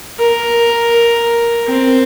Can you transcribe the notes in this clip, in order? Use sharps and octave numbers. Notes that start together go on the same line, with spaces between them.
A#4
C4